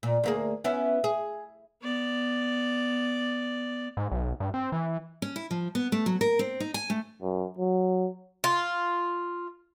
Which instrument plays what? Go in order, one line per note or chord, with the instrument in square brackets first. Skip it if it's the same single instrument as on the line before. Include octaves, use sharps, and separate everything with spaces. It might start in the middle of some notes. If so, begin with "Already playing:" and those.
[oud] A#2
D2 A#3 G#4
B3 C#4 E4
G#4
[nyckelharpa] B3 D5
[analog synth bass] G#2
B1
G2
C4
E3
[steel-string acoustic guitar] C#4
E4
F3
B3
A3
F#3
A#4
C4
D#4
G#5
A3
[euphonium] F#2
F#3
[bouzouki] F4